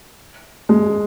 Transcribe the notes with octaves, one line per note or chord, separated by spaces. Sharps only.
G#3